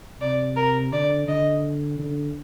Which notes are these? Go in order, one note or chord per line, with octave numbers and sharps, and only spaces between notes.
C3 D5
A#4
D3 D5
D3 D#5
D3